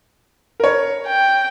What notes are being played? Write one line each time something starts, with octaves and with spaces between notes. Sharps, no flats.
A#4 C#5
G5